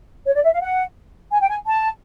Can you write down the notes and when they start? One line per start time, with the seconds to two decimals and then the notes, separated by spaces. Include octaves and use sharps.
0.26 C#5
0.35 D5
0.44 E5
0.53 F5
0.61 F#5
1.32 G#5
1.40 G5
1.49 G#5
1.67 A5